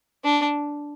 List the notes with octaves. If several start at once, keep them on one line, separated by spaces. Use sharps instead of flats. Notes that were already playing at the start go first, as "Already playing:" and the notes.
D4